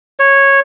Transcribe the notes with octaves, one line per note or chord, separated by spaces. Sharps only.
C#5